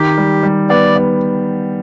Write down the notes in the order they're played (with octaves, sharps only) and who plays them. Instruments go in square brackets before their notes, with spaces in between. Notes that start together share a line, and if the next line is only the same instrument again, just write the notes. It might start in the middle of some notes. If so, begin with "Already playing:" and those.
Already playing: [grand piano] D#3 [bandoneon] G4
[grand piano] G3
G3
[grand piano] B3 [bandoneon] D5
[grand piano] B3